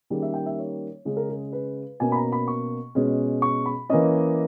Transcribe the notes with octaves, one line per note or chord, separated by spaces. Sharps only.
D#3 G3 A#3 C#4 G#4
E5
G5
E5
C#5
C#3 G#3 C#4
A#4
G#4
B4
B2 A#3 C#4 G#5
B5
A#5
B5
C#6
B2 G#3 C#4
C#6
B5
E3 A#3 C#4 D#5